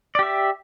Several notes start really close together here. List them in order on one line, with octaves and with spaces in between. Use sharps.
D5 G4 E5